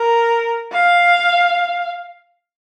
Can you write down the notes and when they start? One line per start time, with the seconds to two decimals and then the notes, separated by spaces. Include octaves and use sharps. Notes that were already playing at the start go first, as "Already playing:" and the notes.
Already playing: A#4
0.72 F5